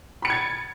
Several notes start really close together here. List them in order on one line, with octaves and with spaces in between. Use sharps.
B5 C#7 D7 G#6 A6